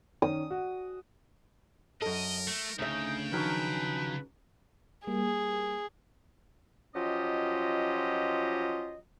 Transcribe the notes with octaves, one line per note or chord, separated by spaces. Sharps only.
D#3 C#4 D#6
F#4
F#2 A4 A#4 D#5
A3
D2 C#3 D#4 E5 G5
D#3 F3 F#3 B4
G3 A#3 G#4
F3 F#3 C#4 F4 G4 D#5